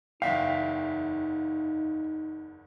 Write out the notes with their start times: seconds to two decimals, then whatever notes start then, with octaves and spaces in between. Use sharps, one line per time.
0.22 F#1 E2 D#4 E5 F5 G5